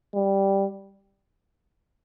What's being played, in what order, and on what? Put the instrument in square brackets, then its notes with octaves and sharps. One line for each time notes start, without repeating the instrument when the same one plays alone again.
[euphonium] G3